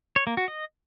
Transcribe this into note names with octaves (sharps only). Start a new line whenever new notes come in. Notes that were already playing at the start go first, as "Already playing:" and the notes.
C#5
A#3
F#4
D#5